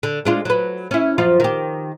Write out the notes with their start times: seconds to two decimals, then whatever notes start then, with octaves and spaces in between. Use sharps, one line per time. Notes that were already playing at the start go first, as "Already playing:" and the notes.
0.03 D3
0.25 G#3 D4 F4
0.45 F#3 B4
0.91 C#4 E4
1.18 F#2 F3 F4
1.40 D#3 G4